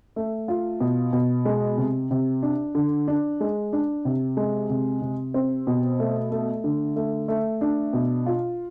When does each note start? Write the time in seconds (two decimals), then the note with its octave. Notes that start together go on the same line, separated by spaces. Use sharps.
0.16 A3
0.48 F4
0.81 B2
1.13 B2
1.45 G#3
1.78 C3
2.11 C3
2.43 D4
2.75 D3
3.08 D4
3.40 G#3
3.73 D4
4.05 C3
4.37 G#3
4.70 C3
5.02 C3
5.34 C4
5.67 B2
6.00 A3
6.32 A3
6.64 D3
6.96 A3
7.28 A3
7.61 D4
7.93 B2
8.26 F4